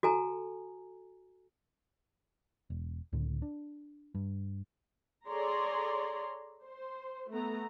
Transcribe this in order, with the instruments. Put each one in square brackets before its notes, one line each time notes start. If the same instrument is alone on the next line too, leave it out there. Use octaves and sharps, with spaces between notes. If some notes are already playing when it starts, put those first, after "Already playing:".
[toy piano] F#4 A4 G#5 A#5
[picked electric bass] E1
C#2 A2 D3
D4
G2
[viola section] G#4 A4 C#5 D5 A#5 C6
C5
A3 B3 A#5